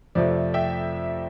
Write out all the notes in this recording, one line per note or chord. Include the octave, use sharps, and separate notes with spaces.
F2 C3 F3 A3 D5
E5 G5